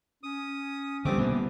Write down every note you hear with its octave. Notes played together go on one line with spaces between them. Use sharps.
C#4 D#6
D3 F3 G3 A3 B3 C4 D4 D6
B2 E3 A#3